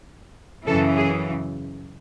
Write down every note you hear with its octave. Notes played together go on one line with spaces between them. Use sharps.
F#2 C#3 E3 A4
G#4